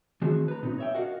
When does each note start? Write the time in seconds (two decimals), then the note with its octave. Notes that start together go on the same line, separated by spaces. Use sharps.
0.22 D#3 E3 A3 C4 F#4 G#4
0.48 B4 A#5
0.63 B1 A#2 C4 D#4 B4
0.78 C#5 E5 G5
0.94 F#4 A#4 D#5 F5 F#5